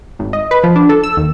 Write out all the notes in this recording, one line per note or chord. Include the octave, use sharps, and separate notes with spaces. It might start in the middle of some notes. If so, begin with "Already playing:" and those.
G#1
D#5
B4
F3
D4
A4
E6
D#2